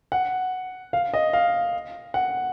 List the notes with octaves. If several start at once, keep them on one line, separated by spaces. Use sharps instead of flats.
F#5
F5
D#5
F5
F#5